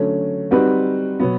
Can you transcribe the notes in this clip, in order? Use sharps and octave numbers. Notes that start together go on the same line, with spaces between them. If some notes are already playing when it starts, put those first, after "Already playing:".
Already playing: D3 F#3 A3 C#4
G3 C4 D#4 F#4 B4
B2 F#3 B3